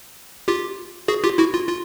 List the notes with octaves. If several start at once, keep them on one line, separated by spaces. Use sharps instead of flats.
F4 G4
F#4 G#4
F4 G4
E4 F#4
F4
F4